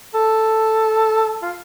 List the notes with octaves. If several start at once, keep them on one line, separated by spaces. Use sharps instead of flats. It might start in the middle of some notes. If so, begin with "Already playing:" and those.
A4
F4